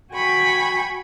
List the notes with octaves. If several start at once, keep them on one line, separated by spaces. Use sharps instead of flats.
F#4 G5 G#5 B5 C#6